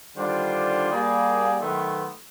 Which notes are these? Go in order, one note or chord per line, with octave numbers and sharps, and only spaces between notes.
D3 D#3 G3 D4 F4 C5
G3 A#3 G#4
B2 D#3 F#3 A3 B3 C6